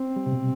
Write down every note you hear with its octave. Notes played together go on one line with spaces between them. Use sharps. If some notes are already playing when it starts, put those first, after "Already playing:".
Already playing: C4
G3
C3
B2